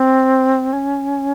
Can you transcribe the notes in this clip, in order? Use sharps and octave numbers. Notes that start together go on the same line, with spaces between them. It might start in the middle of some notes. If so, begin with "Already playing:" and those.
Already playing: C4
C#4